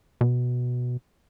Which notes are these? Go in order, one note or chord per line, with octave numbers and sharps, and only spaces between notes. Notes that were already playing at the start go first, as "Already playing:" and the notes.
B2